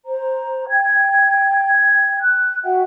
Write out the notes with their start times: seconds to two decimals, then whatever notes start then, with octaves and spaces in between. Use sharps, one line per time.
0.06 C5 A#5
0.69 G5 G#6
2.21 F#6
2.64 F#4 E5 F#5 G5